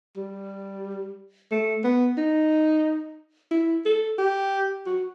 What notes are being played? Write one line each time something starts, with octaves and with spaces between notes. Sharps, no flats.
G3
A3
B3
D#4
E4
A4
G4
F#4